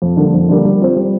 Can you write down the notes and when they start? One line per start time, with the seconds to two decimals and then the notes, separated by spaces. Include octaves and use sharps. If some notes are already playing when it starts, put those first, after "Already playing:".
0.02 F2
0.17 D3 G3 A#3
0.34 F2
0.49 D3 G3 A#3
0.65 G3
0.80 C4 F4 C5
0.96 G3